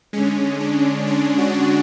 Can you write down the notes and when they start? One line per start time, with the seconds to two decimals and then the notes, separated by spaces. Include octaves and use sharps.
0.13 D3 G#3 C#4
0.60 D4
1.07 D4
1.38 F#4